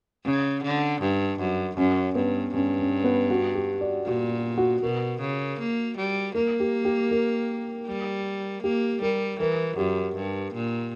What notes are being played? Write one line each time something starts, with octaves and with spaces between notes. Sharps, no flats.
C#3 C#4
D3
G2
F#2
F#2 C#4
G2 B3
G2 C#4
C#4
B3
F#4
G4
D5
A#2 F#4
F#4
B2 A#4
C#3
A#3
G3
A#3 A#4
G4
G4
A#4
G3
A#3 G4
G3 A#4
E3 A#4
F#2 G4
G2
A#2